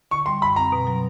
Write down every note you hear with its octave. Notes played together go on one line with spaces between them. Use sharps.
D3 C#6
G3 C6
F#2 B5
C4 A#5
B2
F#3